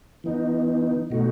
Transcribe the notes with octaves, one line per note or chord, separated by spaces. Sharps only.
E3 B3 D#4
B2 A3 D#4 F#4